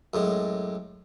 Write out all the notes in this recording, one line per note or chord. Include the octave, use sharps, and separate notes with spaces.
F#2 A2 G#3